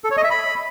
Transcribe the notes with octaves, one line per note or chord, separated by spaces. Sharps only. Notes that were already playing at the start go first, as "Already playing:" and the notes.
A4
C#5
D#5
E5
B5